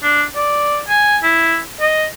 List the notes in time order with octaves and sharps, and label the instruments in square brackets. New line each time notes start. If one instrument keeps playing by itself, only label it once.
[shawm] D4
D5
G#5
E4
D#5